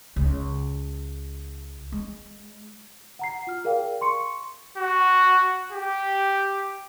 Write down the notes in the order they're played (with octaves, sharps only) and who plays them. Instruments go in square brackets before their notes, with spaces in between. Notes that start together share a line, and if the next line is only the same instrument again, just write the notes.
[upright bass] C#2
G#3
[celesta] F#5 A#5 C7
F4 F6
G#4 A#4 D5 F5 G5
C6 C#6 C#7
[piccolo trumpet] F#4
G4